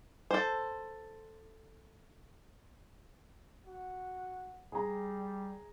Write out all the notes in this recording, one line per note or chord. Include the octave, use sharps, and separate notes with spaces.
A4 C5
F#4
G3 G#4 A#5